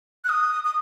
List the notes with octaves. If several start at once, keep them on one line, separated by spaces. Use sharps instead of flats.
F#6
D#6
D#6